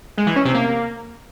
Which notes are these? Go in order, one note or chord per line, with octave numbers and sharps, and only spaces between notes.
G#3
E3
C#4
C3
A#3